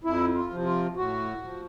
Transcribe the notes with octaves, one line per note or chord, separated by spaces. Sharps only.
F2 E4
F4
C3 F3
F4
A2 F#4
F3